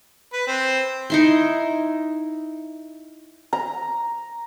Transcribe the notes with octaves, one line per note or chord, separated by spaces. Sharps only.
B4
C4
D#4 E4 C6
A#5